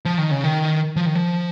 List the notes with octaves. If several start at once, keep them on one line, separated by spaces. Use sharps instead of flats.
F3
D#3
C#3
D#3
F3
D#3
F3